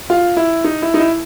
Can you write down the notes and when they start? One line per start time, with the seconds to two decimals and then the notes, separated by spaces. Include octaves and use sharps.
0.10 F4
0.37 E4
0.64 D#4
0.82 E4
0.94 D#4
1.00 E4